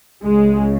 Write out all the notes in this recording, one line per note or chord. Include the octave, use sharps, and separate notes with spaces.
C#2 C#3 G#3